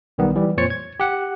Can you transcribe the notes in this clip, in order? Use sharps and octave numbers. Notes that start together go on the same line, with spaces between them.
B1 D#3 G3 B3
E3 G3
F2 A#2 C5 C#5 A6 C#7
G#6
G4 F#5